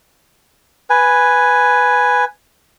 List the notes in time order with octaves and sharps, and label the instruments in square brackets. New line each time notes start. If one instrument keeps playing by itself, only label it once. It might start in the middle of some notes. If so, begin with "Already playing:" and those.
[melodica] B4 G#5